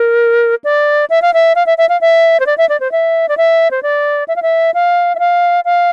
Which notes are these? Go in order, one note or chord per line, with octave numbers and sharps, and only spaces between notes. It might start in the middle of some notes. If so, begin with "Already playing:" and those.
Already playing: A#4
D5
E5
F5
E5
F5
E5
E5
F5
E5
C5
D5
E5
D5
C5
E5
D5
E5
C5
D5
E5
F5
E5
F5
E5
F5
F5